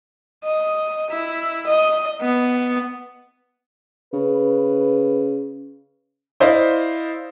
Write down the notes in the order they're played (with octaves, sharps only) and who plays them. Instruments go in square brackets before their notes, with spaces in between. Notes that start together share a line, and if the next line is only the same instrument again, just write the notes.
[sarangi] D#5
E4
D#5
B3
[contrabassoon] C#3 [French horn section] B4
[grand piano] E4 C5 D5 D#5 F5